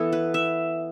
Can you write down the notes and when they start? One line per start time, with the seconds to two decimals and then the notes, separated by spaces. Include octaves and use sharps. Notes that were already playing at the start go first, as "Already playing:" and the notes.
Already playing: E3 B3 E4 A4
0.13 B4
0.34 E5